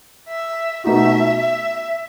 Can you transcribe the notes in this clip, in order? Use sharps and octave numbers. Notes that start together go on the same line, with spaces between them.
E5
B2 A3 D#4 F#4 E5
E5